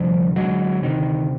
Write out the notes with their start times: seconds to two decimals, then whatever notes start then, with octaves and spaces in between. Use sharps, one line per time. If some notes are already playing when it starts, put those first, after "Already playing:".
Already playing: D2 C3 F3 G3
0.36 D2 F#3 G#3
0.82 C3 D#3